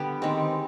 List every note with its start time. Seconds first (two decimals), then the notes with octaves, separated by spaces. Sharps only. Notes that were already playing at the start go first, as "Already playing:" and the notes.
Already playing: D3 G3 B3 G4
0.22 D#3 G#3 C4